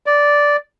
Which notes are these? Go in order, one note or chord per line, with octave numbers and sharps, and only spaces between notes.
D5